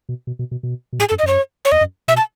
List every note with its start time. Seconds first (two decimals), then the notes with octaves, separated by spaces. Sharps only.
0.09 B2
0.27 B2
0.39 B2
0.51 B2
0.63 B2
0.93 B2
0.99 A2 G#4
1.09 F#2 A4
1.19 D#5
1.23 F#2 C#5
1.65 C#5
1.72 E2 D#5
1.81 F#2
2.08 B2 E5
2.17 A5